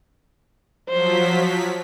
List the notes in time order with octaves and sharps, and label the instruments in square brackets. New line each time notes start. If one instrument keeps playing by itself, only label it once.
[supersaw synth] F3 F#3 B6 [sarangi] C5